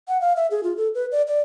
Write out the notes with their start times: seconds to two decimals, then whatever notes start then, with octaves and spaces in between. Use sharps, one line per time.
0.08 F#5
0.21 F5
0.36 E5
0.51 G#4
0.63 F4
0.77 A4
0.95 B4
1.12 D5
1.27 D5